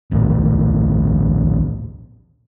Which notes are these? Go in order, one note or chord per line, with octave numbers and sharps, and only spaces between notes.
A#1 D#2 A2